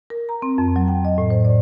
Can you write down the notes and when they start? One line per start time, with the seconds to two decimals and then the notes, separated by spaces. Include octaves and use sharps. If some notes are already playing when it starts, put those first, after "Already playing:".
0.10 A#4
0.29 A#5
0.42 C4
0.58 F2
0.76 F#3
0.88 G5
1.05 D#5
1.18 A2
1.30 C5
1.45 D5